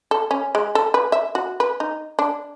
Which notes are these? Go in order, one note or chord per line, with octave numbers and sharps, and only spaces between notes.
A4
C#4
G#3
A4
B4
E5
F#4
B4
D#4
D4